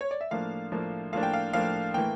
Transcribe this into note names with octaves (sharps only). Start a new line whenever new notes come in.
C#5
D5
E5
A2 F3 A#3 D4 F5
A2 F3 A#3 D4
A2 F3 A#3 D4 F5
G5
F5
A2 F3 A#3 D4 F5
A2 E3 A#3 G5